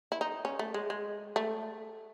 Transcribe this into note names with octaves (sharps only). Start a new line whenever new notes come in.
E4
D#4
C#4
A3
G#3
G#3
A3